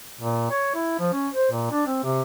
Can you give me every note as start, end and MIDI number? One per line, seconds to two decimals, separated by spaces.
0.20 0.50 46
0.50 0.71 73
0.74 0.95 64
0.99 1.13 53
1.13 1.28 61
1.34 1.48 72
1.51 1.69 46
1.71 1.84 62
1.86 2.00 60
2.03 2.22 48